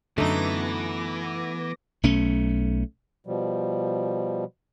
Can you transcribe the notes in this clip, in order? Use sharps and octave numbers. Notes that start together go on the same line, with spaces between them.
F#2 D3 E3 A3 B3 D#4 D6 A#6
B1 A3 C#4
B2 F3 G3